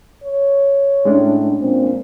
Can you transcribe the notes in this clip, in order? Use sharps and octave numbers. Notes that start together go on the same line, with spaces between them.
C#5
A2 G#3 C#4 D4
A#2 C4